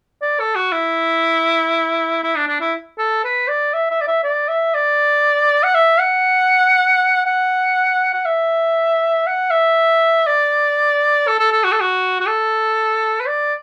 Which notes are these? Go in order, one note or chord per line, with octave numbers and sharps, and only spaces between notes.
D5
A4
F#4
E4
E4
D4
D4
E4
A4
B4
D5
E5
E5
D5
E5
D5
E5
D5
F#5
E5
F#5
F#5
F#5
E5
F#5
E5
D5
A4
A4
A4
F#4
A4
F#4
F#4
A4
B4
D5